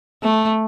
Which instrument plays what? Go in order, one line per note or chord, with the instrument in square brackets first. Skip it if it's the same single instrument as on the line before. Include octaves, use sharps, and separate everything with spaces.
[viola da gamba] A3